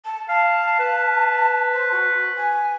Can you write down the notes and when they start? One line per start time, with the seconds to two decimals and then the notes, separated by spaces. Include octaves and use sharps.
0.05 A5
0.29 F5 A5
0.79 B4
1.73 C5
1.91 F#4
2.37 G#5